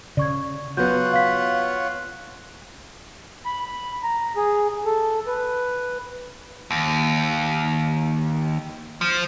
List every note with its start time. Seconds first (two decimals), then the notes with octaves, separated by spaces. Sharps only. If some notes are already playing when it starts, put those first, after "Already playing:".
0.17 C#3 D5 C#6 G#6
0.77 F#3 B3 F4 C#5 F#5 G6
1.13 F5 B6
3.45 B5
3.65 B5
4.03 A#5
4.36 G#4
4.85 A4
5.27 B4
6.71 D#2
9.01 F3